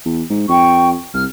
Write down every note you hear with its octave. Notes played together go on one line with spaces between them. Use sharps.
E2
G#2
F2 G5 C#6
C2 F6